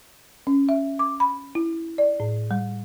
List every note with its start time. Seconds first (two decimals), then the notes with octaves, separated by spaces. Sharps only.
0.47 C#4
0.69 E5
0.99 D6
1.20 B5
1.55 E4
1.98 D5
2.20 A2
2.51 G3